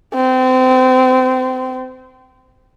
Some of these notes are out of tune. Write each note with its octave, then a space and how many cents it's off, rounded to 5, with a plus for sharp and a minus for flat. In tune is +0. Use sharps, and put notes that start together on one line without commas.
C4 -30